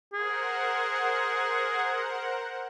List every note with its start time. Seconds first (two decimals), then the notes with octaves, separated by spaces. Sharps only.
0.13 G#4 A#4 C5 F#5